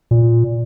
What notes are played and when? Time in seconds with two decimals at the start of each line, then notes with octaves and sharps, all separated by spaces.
0.11 A#2